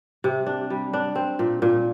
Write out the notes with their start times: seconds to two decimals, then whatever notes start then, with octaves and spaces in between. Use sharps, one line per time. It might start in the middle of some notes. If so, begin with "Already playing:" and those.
0.24 C3
0.46 D4
0.70 G3
0.93 D4
1.15 C4
1.39 A#2
1.62 A#2